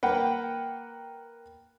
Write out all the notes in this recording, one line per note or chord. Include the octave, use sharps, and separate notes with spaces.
A#3 B4 F#5 G5